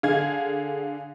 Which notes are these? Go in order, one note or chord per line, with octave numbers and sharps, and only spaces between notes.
D3 G#4 F5 G#6